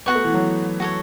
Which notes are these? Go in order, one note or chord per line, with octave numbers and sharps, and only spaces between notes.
B3 F#4 A4 F#5 C#6
A3
E3
F#3
F#4 A4 C#5